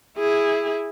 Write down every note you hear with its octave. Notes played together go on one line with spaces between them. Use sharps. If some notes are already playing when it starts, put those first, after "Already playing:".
E4 G#4